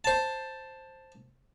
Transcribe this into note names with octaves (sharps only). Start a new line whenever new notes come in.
C5 A5